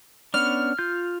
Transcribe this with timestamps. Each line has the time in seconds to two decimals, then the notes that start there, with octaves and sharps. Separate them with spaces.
0.34 B3 C#4 D4 F6
0.79 F4 G6